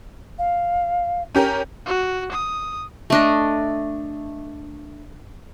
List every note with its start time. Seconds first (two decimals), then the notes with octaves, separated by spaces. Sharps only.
0.38 F5
1.35 C#4 G4 A#4
1.86 F#4
2.32 D#6
3.10 A3 D4 D#5